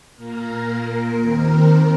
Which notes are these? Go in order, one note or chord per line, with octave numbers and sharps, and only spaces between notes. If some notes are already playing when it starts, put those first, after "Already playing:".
A#2 A#3 A#4
D#2 D#3 C4